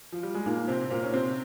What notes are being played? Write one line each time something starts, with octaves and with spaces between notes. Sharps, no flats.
F3
G3
G#3
A#2 A#3 D#4
C3 C4 C5
C4
A#2 A#3 C5
C#4
C3 C4 C5